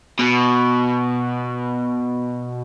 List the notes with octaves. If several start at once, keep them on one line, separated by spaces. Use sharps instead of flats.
B2